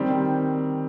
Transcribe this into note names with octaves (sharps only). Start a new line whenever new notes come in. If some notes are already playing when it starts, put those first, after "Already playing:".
Already playing: D#3 G3 C4